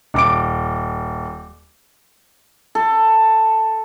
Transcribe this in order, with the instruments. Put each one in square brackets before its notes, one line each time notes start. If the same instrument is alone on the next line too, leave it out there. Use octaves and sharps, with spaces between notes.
[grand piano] D#1 D6 D7
[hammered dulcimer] A4